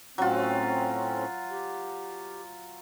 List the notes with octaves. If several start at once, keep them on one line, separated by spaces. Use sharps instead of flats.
A2 F#3 C4 C#4 F4
G4